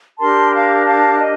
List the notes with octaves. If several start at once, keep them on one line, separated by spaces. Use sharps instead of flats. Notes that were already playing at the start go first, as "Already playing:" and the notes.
D4 G4 A#4 A5 C6
F5 A5
F5 A5
D#5